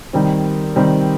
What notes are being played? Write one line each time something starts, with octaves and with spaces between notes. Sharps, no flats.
D#3 G3 C4
D#3 G3 C4